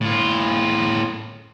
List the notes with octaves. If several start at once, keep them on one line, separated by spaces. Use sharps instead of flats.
A2 F4